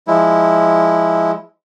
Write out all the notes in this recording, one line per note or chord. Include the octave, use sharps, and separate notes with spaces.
F3 G#3 E4